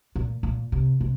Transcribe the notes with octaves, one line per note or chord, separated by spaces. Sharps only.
A#2
A#2
C3
C3